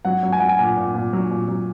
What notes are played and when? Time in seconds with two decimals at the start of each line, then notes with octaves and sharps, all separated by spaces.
0.05 F#3 F#5
0.23 F#3
0.32 G#5
0.39 F#3 F#5
0.49 G#5
0.59 A#2 G#5
0.77 A#2
0.94 A#2
1.13 F#3
1.30 A#2
1.48 F#3